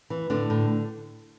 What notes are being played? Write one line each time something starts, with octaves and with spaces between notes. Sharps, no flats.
E3
A2 D3 D4
A2